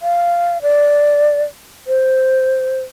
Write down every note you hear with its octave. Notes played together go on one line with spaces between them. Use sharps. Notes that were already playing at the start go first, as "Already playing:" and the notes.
F5
D5
C5